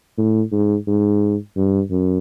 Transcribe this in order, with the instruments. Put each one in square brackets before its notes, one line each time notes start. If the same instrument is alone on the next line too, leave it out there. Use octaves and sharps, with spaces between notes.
[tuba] A2
G#2
G#2
G2
F#2